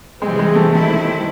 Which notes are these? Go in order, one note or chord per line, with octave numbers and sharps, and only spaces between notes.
C3 E3 G3 G#3 C4
G#3
A3
D#3 G3 A3 C4 E4